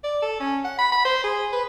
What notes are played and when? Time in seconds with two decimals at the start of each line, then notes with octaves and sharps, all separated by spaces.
0.04 D5
0.22 A4
0.40 C#4
0.64 F#5
0.79 B5
0.92 B5
1.05 C5
1.24 G#4
1.52 B4